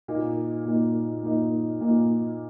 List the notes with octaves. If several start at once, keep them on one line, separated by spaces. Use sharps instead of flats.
A#2 A#3 D#4
A#2 A#3 D#4
A#2 A#3 D#4
A#2 A#3 D#4